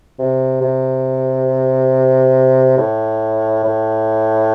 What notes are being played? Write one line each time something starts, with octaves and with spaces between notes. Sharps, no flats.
C3
C3
A2
A2